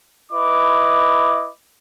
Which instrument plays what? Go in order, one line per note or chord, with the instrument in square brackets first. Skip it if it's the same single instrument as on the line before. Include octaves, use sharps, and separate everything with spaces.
[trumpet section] E4 B4 D#5 D6